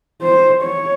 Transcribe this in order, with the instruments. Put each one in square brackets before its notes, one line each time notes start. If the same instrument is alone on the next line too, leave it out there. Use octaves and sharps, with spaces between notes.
[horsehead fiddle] C5
C#5